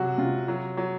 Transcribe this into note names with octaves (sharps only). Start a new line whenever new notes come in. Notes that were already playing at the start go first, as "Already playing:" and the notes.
Already playing: C3 F#3 F#4
C3 F4
F#3
F#3